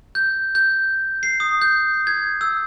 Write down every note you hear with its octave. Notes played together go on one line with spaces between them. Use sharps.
G6
G6
C7
D#6
G6
G#6
E6